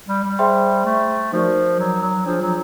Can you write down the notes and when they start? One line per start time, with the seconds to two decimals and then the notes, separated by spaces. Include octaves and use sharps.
0.08 G3
0.24 G3
0.39 G#4 C5 E5 G5 C6
0.86 A3
1.32 F3 D#4 F#4 A#4 D5
1.79 F#3
2.03 F#3
2.25 F3 D4 F4 G#4
2.42 F#3